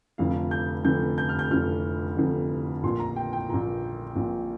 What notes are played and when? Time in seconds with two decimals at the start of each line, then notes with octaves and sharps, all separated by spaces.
0.18 F1 F2 D3 F5
0.51 G6
0.85 F1 F2 D3 G6
1.18 G6
1.29 F6
1.39 G6
1.51 F1 F2 D3 F6
2.17 F1 F2 D3
2.83 A#1 A#2 C6
3.00 A#5
3.16 G5
3.33 G5
3.49 A#1 A#2 A#5
4.15 A#1 A#2